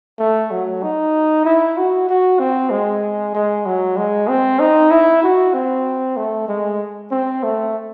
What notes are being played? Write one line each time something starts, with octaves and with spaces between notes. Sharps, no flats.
A3
F#3
D#4
E4
F#4
F#4
C4
G#3
G#3
F#3
G#3
C4
D#4
E4
F#4
C4
A3
G#3
C4
A3